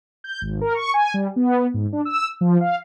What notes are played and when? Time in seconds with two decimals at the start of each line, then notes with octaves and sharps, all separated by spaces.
0.24 G6
0.41 G#1
0.61 A#4
0.75 C#6
0.94 G#5
1.14 G3
1.36 B3
1.74 G#2
1.93 D4
2.05 E6
2.41 F3
2.61 F5